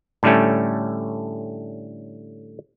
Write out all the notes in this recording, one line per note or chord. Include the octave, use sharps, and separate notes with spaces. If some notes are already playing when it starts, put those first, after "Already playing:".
A2 D3 G3 A3 C#4